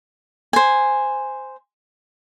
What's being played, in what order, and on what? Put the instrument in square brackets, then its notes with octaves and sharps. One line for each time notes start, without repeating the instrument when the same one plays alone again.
[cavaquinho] C5 G#5